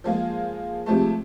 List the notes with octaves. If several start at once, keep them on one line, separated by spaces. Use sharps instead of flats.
F3 G#3 A#3 F4 G#4
C3 F3 G#3 A3